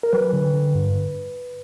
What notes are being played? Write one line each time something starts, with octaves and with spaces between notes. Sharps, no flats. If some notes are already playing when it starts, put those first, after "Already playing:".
A#4
F#3 B4
D3
D3
G2